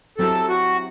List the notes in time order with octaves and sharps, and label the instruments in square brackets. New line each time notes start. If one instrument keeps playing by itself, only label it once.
[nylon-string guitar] F#3 C4 E4 G4 [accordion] A4
[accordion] F#4